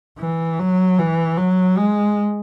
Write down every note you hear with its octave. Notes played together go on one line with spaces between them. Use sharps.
E3
F#3
E3
F#3
G#3